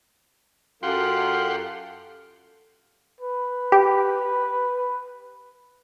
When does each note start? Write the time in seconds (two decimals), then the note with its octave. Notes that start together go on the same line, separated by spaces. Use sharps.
0.83 F#2 F4 G4 A4 F#5 C6
3.21 B4
3.72 G4